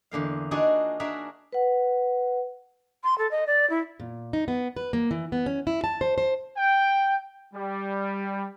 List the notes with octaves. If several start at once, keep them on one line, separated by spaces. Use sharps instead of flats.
E2 D3 A#3 F5
D4 D#4 F4 F#4 G#4 D5
D4 F#4 G#4 A#4 E5 A#5
B4 F#5
C6
A4
D#5
D5
E4
A#2
D#4
B3
B4
A#3
E3
B3
C#4
E4
A5
C5
C5
G5
G3